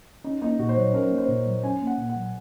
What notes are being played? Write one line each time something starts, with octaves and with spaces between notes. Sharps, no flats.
C#4 D#4
A#3 D#4
A#2 F#4
C5
F#3 C#5
C#4 A#4
A#3
C5
A#2
F#3
C#4 G#5
A#3
F#5
A#2
F#5
F#3